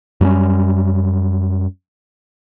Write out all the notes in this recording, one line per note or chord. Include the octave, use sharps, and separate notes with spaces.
F#2 G3 A#3 C#4